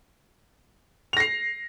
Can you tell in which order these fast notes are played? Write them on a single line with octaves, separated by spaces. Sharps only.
F7 A#6 C7